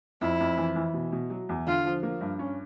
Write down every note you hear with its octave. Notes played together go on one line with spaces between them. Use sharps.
F2 E4
F2
E3
E3
B2
B2
F#3
E2
D3 F4
F3
A#3
G2
C#4